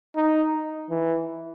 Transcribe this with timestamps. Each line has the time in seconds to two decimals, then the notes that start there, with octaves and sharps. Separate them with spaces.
0.16 D#4
0.90 E3